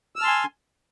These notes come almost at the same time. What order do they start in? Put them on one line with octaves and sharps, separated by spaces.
E6 F6 A5 C6 G#5